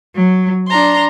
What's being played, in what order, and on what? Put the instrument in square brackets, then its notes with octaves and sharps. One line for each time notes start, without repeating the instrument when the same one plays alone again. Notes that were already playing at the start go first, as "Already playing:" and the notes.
[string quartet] F#3
D4 A#5 C6